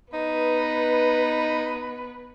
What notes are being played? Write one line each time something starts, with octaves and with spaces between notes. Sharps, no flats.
B3 D#4 B4